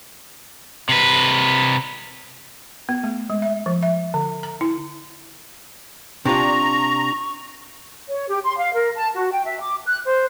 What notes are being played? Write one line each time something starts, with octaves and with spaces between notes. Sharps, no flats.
C3 B4
B3
A3
G#3
E5
F3
E5
D3
A#5
E4
C3 D4 F4 A#5 C#6
C#5
G4
C6
F5
A#4
A5
F#4
G5
E5
D6
F#6
C5